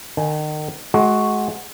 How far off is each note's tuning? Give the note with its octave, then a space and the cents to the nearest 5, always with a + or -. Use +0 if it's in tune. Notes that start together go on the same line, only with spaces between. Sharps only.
D#3 -35 G#5 +0
G#3 +30 F#4 +0